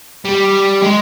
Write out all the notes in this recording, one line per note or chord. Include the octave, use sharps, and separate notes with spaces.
G3
G#3